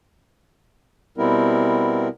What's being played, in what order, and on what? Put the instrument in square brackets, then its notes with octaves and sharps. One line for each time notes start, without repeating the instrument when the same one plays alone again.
[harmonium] B2 G3 B3 C4 E4 A#4